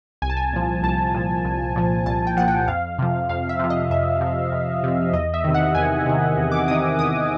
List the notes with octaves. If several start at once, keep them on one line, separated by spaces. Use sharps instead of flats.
C2 G#5
A5
G#5
A#2 F3
C2 A5
A#2 F3
C2
A#2 F3
C2 A5
G5
A#2 F3 F#5
G5
F2 F5
C3 F3
F2 F5
E5
C3 F3
D#5
F2 E5
C3 F3
F2
C3 F3
E2 D#5
E5
C3 D#3
F#5
E2 G#5
C3 D#3
E2
D6
C3 D#3 D#6
E2 D#6